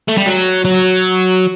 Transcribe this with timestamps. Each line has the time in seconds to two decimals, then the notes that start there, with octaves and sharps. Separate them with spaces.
0.08 A3
0.17 G3
0.26 F#3
0.65 F#3